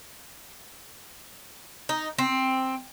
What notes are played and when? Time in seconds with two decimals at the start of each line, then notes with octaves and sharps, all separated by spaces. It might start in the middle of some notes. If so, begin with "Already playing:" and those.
1.89 D#4
2.18 C4